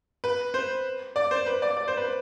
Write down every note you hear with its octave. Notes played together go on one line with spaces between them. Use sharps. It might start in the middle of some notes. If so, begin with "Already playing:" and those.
B4
C5
D5
C5
B4
D5
D5
C5
B4